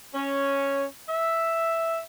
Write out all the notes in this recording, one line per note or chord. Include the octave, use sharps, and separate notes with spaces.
C#4
E5